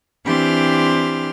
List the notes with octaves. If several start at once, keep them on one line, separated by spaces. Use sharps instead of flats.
E3 C4 D4 G4 C6 F6